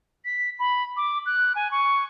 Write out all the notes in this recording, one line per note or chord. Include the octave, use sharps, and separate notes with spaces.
B6
B5
D6
F#6
G#5
C#6